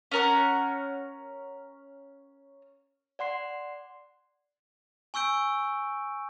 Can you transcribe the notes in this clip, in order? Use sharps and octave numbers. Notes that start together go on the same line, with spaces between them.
C#4 A#4 F#5
D5 F#5 C6 C7
G#5 C#6 E6 G6 D7